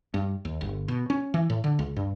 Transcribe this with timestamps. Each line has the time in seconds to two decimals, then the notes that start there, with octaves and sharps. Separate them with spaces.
0.14 G2
0.45 D#2
0.61 G1
0.88 B2
1.10 C#4
1.34 E3
1.50 A2
1.64 D3
1.79 C#2
1.97 G2